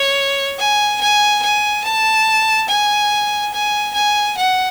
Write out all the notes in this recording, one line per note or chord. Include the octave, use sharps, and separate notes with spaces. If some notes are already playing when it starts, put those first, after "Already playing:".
Already playing: C#5
G#5
G#5
G#5
A5
G#5
G#5
G#5
F#5